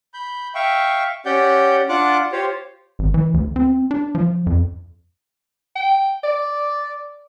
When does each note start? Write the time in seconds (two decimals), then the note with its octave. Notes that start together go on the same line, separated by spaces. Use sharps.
0.14 B5 G6
0.55 E5 F5 G5 C#6
1.26 C#4 G4 D5 F#5 G5 G6
1.89 D4 F4 F#5 D6 F#6
2.32 F4 G4 C5 C#5 F5
2.99 G#1
3.14 E3
3.34 D2
3.56 C4
3.91 D4
4.15 F3
4.47 F2
5.76 G5
6.24 D5